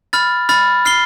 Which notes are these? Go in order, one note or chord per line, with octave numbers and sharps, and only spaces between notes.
B5 F6 A6
B5 F6 A6
F6 C7 G7